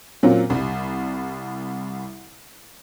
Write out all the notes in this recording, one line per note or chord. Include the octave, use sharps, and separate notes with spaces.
A#2 F#3 C4 C#4 F4
C2 G3